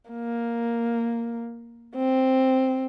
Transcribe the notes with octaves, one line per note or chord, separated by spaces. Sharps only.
A#3
C4